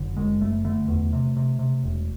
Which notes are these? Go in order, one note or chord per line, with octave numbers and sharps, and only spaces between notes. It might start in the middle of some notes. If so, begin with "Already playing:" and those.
Already playing: F#1 D3
F#2 G#3
F#1 A3
D3 A3
E2
C3
C3
C3
E1